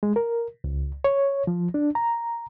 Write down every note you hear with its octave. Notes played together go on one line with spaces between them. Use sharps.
G#3
A#4
C#2
C#5
F3
D4
A#5